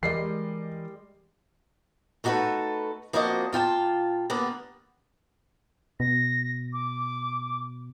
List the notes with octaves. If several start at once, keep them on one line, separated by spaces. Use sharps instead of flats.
E3 G3 G#3 A#4 D5 D#5 C7
A3 D#4 F#4 G4 A4 B4
F3 A#3 C4 D4 F#4 D#5
A#2 F4 G5 A5
D3 G3 A#3 B3
B2 A#6
D6